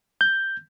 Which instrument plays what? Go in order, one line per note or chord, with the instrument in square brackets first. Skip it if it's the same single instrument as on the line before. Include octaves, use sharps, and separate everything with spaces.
[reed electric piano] G6